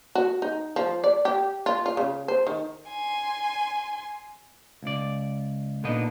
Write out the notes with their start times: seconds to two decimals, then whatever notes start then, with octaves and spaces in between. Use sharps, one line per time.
0.15 F#4
0.42 D#4
0.76 F3
1.04 D5
1.25 G4
1.66 F4
1.86 F4
1.97 C#3
2.28 C5
2.47 D#3
2.89 G#5 C6
4.83 C#2 D5
5.84 A#2 D3 B3 D4 D#4 D#5